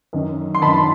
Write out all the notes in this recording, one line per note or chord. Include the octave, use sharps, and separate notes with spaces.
F#2 D#3
C6
F#2 D#3 A5 B5